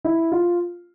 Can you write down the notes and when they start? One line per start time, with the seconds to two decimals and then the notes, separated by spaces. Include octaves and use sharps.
0.05 E4
0.32 F4